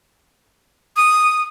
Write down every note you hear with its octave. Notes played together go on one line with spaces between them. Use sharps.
D#6